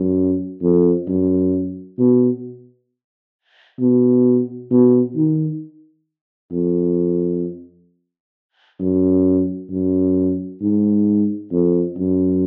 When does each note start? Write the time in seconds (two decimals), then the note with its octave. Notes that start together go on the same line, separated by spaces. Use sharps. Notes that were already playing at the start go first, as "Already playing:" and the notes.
Already playing: F#2
0.62 F2
1.07 F#2
1.98 B2
3.80 B2
4.71 B2
5.16 D#3
6.52 F2
8.80 F#2
9.70 F#2
10.61 G#2
11.51 F2
11.97 F#2